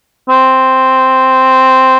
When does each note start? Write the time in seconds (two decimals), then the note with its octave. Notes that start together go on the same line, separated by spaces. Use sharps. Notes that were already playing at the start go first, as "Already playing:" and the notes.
0.29 C4